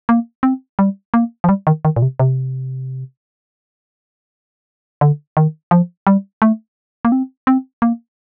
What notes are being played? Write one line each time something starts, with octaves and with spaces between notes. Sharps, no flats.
A#3
C4
G3
A#3
F3
G3
D#3
D#3
A#2
C3
C3
D3
D#3
F3
G3
A3
A#3
C4
C4
A#3